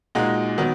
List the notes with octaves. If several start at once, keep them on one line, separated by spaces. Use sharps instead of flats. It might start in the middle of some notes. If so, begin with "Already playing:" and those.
A#2 G#3 D#4 F#4
D#3 F#3 B3